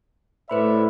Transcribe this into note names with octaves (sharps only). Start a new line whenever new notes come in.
A2 B4 C5 D5 E5 B5